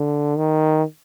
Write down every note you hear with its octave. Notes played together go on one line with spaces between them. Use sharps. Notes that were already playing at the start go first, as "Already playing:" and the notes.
Already playing: D3
D#3